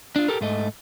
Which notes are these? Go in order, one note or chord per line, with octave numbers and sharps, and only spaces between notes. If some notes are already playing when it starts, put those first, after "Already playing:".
D4 F4
G4 A4 A#4
G#2 A3 D#5